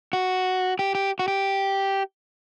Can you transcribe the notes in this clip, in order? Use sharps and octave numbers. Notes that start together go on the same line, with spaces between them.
F#4
G4
G4
F#4
G4